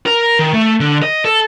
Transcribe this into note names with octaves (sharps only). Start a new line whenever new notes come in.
A#4
D#3
A3
D3
D#5
A4